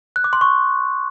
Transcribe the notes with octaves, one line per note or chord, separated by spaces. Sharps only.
F#6
D6
C6
C#6